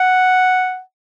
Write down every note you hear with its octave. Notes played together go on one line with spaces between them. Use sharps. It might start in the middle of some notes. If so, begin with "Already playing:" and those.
Already playing: F#5